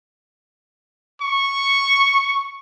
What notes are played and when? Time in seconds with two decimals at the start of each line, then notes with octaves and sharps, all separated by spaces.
1.21 C#6